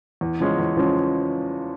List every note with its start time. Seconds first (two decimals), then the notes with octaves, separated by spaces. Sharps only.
0.21 E2
0.40 C#3 F3 G#3 C#4
0.58 E2
0.76 C#3 F3 G#3 C#4